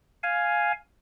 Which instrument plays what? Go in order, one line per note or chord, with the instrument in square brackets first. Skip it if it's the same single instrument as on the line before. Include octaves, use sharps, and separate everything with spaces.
[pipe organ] F5 G#5